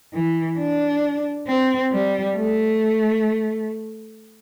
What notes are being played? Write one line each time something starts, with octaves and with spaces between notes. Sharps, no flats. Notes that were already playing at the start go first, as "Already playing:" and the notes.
E3
D4
C4
G3
A3